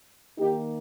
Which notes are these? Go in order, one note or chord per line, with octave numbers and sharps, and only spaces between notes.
D#3 A#3 D#4 G4